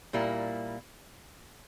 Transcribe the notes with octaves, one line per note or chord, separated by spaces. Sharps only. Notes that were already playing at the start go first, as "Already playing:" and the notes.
A#2 G3 A#3 E4